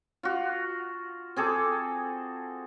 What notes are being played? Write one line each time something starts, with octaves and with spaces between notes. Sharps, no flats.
F4 F#4
C4 G#4 A4 D6